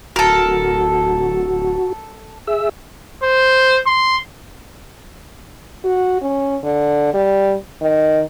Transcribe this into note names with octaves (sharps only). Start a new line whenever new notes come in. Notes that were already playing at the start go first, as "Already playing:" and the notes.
D1 F#4 A4 A#4
G#4 E5 E6
C5
C6
F#4
C#4
D3
G3
D#3